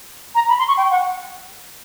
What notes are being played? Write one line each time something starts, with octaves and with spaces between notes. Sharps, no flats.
A#5
B5
C6
C#6
G5
F#5